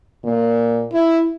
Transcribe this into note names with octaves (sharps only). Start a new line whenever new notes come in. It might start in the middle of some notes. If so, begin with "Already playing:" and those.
A#2
E4